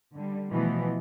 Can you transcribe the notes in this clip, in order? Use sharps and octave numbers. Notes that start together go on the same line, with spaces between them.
D3 G3
B2 E3 F3 A3 B3